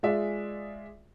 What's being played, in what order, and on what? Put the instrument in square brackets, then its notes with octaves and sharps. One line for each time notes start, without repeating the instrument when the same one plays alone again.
[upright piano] G#3 F4 G#4 D5 E5